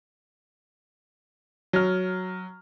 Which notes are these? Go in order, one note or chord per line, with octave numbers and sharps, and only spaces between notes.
F#3 F6